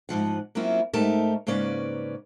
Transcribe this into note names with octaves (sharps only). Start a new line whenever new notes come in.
G#2 C#3 F3 F#5
F#3 A#3 C4 C#4 E4 F4
G#2 A3 D#4 G4 A#4 A5
G#2 C#3 A#3 C#4 B4 D5